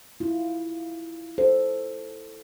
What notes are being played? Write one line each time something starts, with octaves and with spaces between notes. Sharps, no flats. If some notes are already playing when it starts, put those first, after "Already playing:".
E4 F4
A4 C5